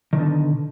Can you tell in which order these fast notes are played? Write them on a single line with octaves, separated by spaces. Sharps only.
D#3 B2 D3